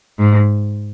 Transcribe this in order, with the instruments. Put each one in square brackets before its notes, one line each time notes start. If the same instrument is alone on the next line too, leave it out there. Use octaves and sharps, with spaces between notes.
[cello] G#2